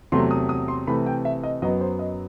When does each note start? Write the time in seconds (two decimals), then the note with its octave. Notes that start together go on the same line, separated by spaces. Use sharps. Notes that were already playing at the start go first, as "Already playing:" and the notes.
0.12 E2 C3 F#3 A3 C6
0.31 D#6
0.49 D#6
0.68 C6
0.87 C3 E3 A3 B5
1.06 G5
1.25 E5
1.44 D#5
1.62 F#2 F#3 B3 D#5
1.81 C5
1.99 D#5